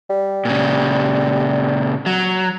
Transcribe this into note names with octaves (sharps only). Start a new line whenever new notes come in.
G3
A#2 C#3
F#3